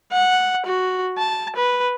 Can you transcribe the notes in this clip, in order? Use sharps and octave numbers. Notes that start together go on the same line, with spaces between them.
F#5
F#4
A5
B4